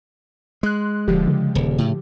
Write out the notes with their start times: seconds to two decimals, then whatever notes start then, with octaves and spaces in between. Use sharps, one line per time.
0.63 G#3 C6 F#6
1.08 D#1 D3 F3 G4
1.27 C#3
1.55 D#1
1.78 A2